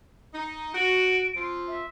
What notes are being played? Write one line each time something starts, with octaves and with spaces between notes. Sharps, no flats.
D#4
F#4 D7
F3 C4 F4
E5